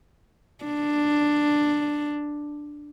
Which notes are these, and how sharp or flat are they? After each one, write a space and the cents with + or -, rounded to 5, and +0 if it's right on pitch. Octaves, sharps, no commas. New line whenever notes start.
D4 +5